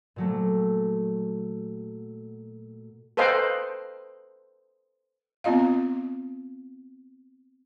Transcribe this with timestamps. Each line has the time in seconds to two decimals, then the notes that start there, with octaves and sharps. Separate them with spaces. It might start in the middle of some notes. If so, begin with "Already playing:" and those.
0.16 A#2 F#3 A3
3.17 A4 B4 C5 D#5 F5 G5
5.44 B3 C4 F4 D#5 F5